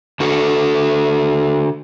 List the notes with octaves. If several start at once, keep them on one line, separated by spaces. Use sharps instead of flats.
D3 F#4 A4